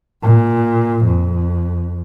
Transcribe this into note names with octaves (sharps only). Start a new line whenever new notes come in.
A#2
F2